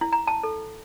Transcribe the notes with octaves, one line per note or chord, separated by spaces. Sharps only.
E4
A#5
A5
A4